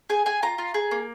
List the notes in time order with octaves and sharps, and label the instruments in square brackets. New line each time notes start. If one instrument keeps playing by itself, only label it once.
[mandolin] G#4 G#5
G#4 G#5
F4 A#5
F4
G#4
A#3